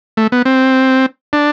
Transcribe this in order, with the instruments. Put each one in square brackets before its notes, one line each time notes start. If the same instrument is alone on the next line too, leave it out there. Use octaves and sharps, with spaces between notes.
[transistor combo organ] A3
B3
C4
D4